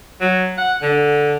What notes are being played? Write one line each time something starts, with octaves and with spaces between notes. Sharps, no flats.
F#3
F#5
D3